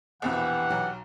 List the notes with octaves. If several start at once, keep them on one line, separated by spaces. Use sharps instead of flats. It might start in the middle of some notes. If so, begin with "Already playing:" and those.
A#1 E2 B2 E3 G4 F#5
B1 F#3